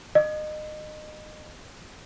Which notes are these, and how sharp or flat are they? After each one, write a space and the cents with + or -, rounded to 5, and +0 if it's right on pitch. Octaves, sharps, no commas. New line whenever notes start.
D#5 -25